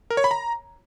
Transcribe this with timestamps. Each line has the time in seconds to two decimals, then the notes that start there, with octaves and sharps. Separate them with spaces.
0.10 A#4
0.17 C#5
0.24 B5
0.31 A#5